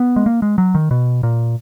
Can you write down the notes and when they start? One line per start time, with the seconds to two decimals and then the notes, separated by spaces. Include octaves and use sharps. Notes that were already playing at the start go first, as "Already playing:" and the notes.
Already playing: B3
0.16 G#3
0.26 A#3
0.42 G#3
0.58 F#3
0.75 D#3
0.91 B2
1.23 A#2